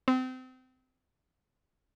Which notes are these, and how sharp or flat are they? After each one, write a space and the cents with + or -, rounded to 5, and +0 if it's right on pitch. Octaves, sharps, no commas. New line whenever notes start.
C4 -30